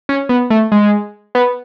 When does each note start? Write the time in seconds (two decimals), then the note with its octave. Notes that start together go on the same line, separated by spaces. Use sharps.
0.09 C#4
0.29 B3
0.50 A3
0.72 G#3
1.35 B3